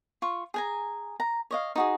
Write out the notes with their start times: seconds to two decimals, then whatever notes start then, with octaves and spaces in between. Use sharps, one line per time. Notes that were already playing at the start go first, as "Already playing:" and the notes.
0.22 F4 C#6
0.54 G#4 G#5 A#5
1.20 A#5
1.51 C#5 D#5 F5
1.76 D#4 F#4 G#4